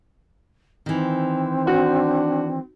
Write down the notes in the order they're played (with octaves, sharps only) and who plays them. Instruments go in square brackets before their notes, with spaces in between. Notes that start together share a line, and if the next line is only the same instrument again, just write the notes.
[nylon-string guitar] D#3 E3 [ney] C4
[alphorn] D4 [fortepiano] F#4